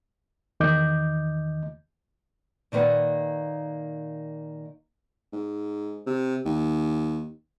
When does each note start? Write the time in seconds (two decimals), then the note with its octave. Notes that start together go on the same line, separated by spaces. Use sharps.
0.60 E2 D#3 D#5 D6 G6
2.72 A#2 D#3 A#3 B4 F#5
5.33 G#2
6.06 C3
6.45 D#2